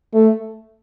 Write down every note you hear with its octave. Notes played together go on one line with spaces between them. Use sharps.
A3